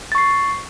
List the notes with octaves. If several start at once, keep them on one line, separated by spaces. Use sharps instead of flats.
C#6 A6 C7